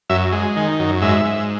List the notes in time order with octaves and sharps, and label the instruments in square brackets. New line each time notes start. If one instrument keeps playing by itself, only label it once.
[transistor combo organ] F#2 E5
G#3
D#3
F#2
G#2 E5
G#2